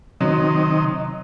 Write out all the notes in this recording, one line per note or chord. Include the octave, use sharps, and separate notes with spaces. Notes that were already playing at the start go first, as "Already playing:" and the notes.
C3 D#3 F#3 D#5